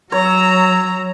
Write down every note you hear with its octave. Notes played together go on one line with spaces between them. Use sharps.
F#3 C#5 A#5 E6